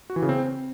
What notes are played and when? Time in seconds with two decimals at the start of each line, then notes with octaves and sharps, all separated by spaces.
0.10 F#4
0.16 E3
0.22 C#3
0.29 C4